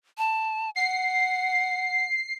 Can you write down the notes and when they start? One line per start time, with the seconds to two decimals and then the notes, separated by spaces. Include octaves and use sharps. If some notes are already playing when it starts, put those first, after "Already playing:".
0.18 A5
0.76 F#5 C7